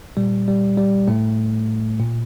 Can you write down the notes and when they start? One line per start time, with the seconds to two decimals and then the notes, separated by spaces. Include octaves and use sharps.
0.17 A#2 G3
0.48 G3
0.78 G3
1.08 A2 A3
1.99 A#2